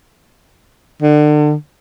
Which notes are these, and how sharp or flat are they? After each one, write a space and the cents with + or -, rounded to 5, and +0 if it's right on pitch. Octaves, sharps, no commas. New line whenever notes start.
D3 +30